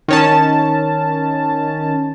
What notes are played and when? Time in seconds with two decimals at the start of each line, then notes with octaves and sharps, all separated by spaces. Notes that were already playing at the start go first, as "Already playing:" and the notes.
0.08 D#3 C#4 A5